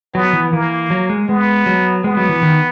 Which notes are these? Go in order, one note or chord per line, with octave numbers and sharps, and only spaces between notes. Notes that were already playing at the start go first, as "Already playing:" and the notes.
F#3 B3
E3
E3 A#3
F#3
G#3
G#3 B3
F#3
G#3 B3
F#3
E3
D#3